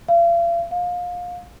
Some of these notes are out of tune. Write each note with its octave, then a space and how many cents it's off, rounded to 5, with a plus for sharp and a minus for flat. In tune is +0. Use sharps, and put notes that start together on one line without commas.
F5 -40
F5 +25